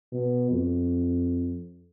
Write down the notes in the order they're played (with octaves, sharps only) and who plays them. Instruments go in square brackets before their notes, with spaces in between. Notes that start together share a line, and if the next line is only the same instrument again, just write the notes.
[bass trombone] B2
F2